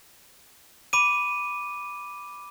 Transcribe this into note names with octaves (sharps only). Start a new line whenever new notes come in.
B5 D6 D#7